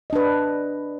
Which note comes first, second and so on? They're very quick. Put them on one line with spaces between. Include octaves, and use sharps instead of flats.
D#5 D4 B4